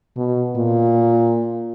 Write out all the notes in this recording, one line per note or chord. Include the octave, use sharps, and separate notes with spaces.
B2
A#2